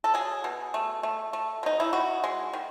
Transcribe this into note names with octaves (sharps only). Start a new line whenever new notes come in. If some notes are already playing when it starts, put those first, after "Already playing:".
A4
F#3 G#4
B2
A3
A3
A3
B2 D#4
E4
D#3 F#4
G#3
D#3